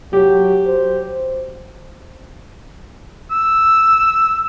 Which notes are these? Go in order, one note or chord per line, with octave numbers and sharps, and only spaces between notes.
F#3 G4
C5
E6